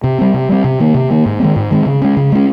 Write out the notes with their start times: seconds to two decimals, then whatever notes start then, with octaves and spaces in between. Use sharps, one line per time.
0.04 C3
0.18 G3 C4
0.34 C3
0.49 G3 C4
0.64 C3
0.80 D#3 A#3
0.94 C3
1.10 D#3 A#3
1.26 G#2
1.40 D#3 G#3 C4
1.56 G#2
1.71 D#3 G#3 C4
1.86 C#3
2.02 G#3 C#4
2.17 C#3
2.32 G#3 C#4